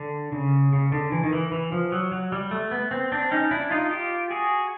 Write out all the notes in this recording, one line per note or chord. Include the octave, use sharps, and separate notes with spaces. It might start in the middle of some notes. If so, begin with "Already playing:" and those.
Already playing: D3
C#3
C#3
D3
E3
D#3
E3
E3
F3
F#3
F#3
G3
A3
B3
C4
C4 D4
C#4 D#4
D4 E4
D#4 F4
F4 G4
F#4 G#4